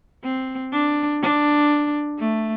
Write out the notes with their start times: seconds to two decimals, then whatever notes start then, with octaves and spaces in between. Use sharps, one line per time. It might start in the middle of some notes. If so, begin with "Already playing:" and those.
0.24 C4
0.73 D4
1.22 D4
2.20 A3